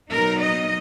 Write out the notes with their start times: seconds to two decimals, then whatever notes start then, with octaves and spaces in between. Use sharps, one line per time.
0.11 B2 F#3 B3 D#4 A#4
0.41 D#5